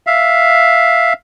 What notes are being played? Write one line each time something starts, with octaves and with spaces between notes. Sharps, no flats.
E5 F5